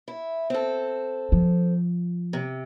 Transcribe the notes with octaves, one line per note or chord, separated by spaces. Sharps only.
E4
C4 A4
F3
C3